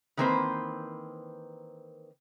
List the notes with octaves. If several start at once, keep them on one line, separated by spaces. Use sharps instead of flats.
D#3 E3 A#3 C4 B4 C5